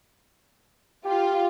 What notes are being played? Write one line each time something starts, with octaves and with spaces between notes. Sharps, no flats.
F4 G4